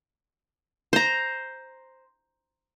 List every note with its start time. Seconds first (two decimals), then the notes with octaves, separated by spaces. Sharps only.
0.93 C5 A#5